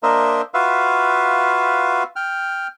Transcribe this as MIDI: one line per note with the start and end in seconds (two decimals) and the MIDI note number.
0.03 0.41 58
0.03 0.41 62
0.03 0.41 70
0.03 0.41 72
0.03 0.41 75
0.03 0.41 76
0.54 2.03 65
0.54 2.03 66
0.54 2.03 71
0.54 2.03 76
0.54 2.03 77
2.16 2.67 79
2.16 2.67 89